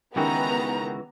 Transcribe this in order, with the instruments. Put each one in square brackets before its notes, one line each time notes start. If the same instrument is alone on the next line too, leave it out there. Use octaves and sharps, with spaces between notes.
[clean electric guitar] C#2 E3 F#4 [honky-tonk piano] D#3 C#4 G4 [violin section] B3 A#5